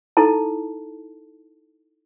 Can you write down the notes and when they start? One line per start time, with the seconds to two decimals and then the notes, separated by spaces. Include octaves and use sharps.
0.17 D#4 E4 A4 A5